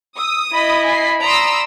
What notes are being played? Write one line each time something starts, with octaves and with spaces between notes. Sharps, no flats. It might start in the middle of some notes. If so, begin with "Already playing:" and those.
D#6 E6
E4 D#5 B5
G#5 B6 C7
D5 A#5 C6 D#6 E6